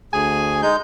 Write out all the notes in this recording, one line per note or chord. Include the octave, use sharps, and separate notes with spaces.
D2 G#4 G#5
G#3 D#4 G6